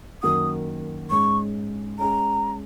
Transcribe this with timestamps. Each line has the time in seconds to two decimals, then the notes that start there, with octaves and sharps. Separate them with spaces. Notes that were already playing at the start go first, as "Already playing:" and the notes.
0.23 F#2 D#3 A#3 F#4 D#6
1.11 G#2 G#3 C#4 C#6
1.99 G#3 C#4 G#4 A#5